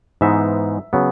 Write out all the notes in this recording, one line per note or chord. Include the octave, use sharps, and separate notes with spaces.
G#2 E3 G#3 B3 D#4 E5
C#3 F#3 B3